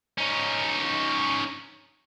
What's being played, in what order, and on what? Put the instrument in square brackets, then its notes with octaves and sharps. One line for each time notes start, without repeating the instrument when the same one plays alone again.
[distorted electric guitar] C#4 D#4